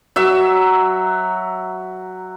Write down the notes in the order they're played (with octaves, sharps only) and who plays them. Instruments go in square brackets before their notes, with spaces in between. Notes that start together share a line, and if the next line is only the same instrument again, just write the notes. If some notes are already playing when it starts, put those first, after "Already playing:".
[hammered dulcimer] F#3 E5